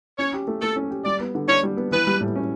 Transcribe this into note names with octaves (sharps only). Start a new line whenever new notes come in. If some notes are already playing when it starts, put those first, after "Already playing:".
C#4 C#5
G4
A3
A3 A4
C#4
G4
G3 D5
B3
D3
D4 C#5
G3
B3
E3 B4
G3
A2
C#4